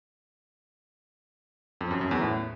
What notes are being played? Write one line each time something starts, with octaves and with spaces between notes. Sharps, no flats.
F2
F#2
F#2
E2
A2